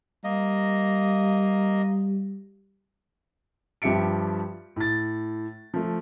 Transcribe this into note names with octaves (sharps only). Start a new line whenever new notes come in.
G3 A#3 D#5
G2 F3 G4 E5 C#7 D7
A2 A6
F3 A3